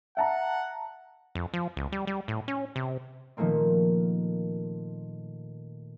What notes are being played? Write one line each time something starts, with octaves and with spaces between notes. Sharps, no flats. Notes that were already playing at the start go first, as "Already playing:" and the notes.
E5 F#5 A5 A#5
F2
F3
C#2
G3
G3
A2
C#4
C3
A#2 D#3 F3 A3 A#3 C4